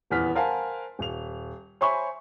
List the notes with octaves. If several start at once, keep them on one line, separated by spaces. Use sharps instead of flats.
D#1 E2 B3 F6 B6
A#4 C5 F5 F#5 G#5 A5
D#1 F7
C5 C#5 E5 G#5 B5 C#6